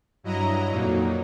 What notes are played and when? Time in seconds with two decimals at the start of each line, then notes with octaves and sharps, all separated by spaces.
0.24 G2 F#3 E4 D#5 A#5
0.71 F2 A#2 F#3 A#3 D#4